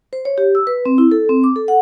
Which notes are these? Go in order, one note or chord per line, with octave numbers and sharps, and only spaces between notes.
C5
C#5
G4
E6
B4
C4
E4
A4
C4
D6
A4
F#5